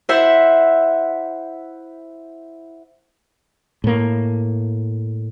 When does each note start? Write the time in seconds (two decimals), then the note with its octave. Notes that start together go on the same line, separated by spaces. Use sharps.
0.09 E4 C5 E5 F#5
3.84 A2 A#3